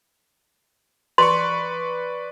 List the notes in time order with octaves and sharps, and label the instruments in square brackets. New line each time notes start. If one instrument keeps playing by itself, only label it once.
[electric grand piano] B4 D5 C#6 [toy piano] C6